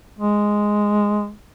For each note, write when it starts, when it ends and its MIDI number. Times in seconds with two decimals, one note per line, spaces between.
0.19 1.31 56